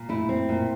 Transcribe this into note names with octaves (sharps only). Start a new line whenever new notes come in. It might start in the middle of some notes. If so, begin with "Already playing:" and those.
Already playing: A#2
A3 E4
C4
A#2